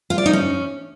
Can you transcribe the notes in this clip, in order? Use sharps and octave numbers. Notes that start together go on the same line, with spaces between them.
F4
D5
D#4
C#4